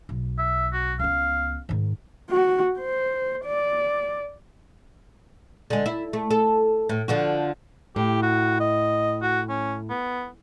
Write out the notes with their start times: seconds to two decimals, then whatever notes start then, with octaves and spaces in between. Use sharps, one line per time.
0.09 B1
0.38 E5
0.73 F#4
0.99 C#2 B3 F5
1.69 G#2 D#3
2.30 F#4
2.80 C5
3.45 D5
5.70 D3 G#3
5.86 E4
6.13 A3
6.31 A4
6.89 A2
7.08 D3 F3 F#4
7.96 A2 G4
8.22 F#4
8.60 D#5
9.22 F#4
9.49 C#4
9.90 B3